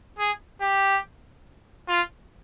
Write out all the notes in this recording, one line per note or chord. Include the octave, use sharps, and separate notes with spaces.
G#4
G4
F4